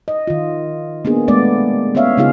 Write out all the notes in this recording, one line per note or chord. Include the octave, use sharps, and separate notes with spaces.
D#5
D#3 F4
A#3 B3 D4 G#4
G#3 A3 B3 D5
B3 C#4 C#5 E5 F5
C#3 B3 D#4 F4 G#4 F5